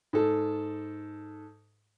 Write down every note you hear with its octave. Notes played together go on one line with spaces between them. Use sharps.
G#2 A4